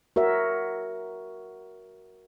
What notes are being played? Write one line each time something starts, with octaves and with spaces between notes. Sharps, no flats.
F#4 A#4 C#5 E5